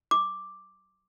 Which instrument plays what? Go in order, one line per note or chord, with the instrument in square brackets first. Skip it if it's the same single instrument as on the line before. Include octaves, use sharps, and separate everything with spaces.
[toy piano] D6